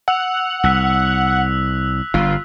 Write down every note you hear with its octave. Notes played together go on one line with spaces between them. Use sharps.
F#5 E6 F7
C2 E6 F#6 B6
G1 G2 F4